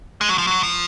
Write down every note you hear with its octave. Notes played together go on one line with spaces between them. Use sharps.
G#3
F#3
F3
F#3
F3